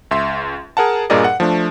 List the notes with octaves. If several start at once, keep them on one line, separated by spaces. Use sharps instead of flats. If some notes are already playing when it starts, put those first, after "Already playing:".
C#2 E5 C6
G#4 A#4 F#5 A5
G2 A#2 G#4 A#4 D5 D#5
F#5
F3 A3 D4